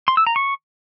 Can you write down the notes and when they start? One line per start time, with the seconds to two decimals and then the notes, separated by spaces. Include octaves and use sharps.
0.08 C6
0.17 E6
0.27 A#5
0.36 C#6